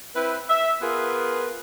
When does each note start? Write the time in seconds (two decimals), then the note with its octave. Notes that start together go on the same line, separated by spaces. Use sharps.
0.15 C4 E4 B4
0.49 E5
0.81 B3 F4 G#4 A#4 B4